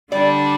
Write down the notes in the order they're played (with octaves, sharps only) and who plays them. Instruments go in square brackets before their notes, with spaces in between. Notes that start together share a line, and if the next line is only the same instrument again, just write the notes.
[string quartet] D3 G3 D4 [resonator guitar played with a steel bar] D5